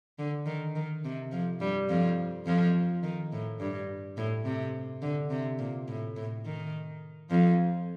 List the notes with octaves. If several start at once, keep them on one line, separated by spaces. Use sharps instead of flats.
D3
D#3
D#3
C3
F2 F3
G2 G3
F2 F3
F2 F3
D#3
A2
G2
A2
C3
D3
C3
A#2
A2
A2
D#3
F2 F3